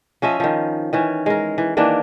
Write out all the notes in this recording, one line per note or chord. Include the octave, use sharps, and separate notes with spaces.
F3 C#4 D#5 E5
D#3 F3
D#3 E3 C#4
G#3 A#4
E3
D#3 E3 A#3 D4